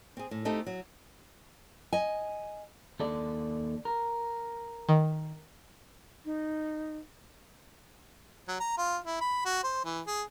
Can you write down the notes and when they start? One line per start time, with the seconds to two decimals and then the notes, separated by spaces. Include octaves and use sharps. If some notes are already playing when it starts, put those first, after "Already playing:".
0.17 C4 G#4
0.31 A2
0.45 A3 C4 D#4 G4 A4
0.67 F#3
1.92 D#5 G#5
3.00 D#2 A4 D5
3.85 A#4
4.89 D#3
6.25 D#4
8.48 F#3
8.60 A#5
8.78 F4
9.04 E4
9.21 B5
9.45 F#4
9.64 C5
9.84 E3
10.07 G#4